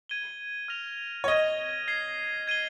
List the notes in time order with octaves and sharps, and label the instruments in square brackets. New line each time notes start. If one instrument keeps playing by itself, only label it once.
[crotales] G#6 D#7 G7
F6 A#6 F7
[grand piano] C#5
[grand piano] D#5 [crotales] G#6 D#7 G7
[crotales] G#6 C7 G7
G#6 D#7 G7